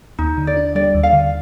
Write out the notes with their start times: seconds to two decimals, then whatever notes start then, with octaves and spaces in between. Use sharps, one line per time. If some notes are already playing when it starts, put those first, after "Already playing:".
0.19 D#2 D#4
0.38 D3
0.47 D5
0.57 D4
0.75 G3 D5
0.94 D#2
1.03 F5
1.13 D3